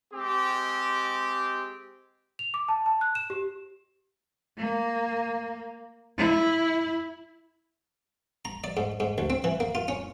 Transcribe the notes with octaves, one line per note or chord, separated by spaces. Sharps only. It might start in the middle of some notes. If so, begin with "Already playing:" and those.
G#3 C4 G4
F7
D6
A5
A5
F#6
E7
G4
A#3
E4
A#5
D5
G#2
G#2
D2
C4
E3
A#3
F4
C#4